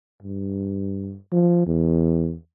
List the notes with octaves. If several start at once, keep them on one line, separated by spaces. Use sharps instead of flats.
G2
F3
E2